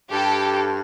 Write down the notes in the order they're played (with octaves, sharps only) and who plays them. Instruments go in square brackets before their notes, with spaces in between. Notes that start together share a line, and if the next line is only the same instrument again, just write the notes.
[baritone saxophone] G2 [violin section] G4 A4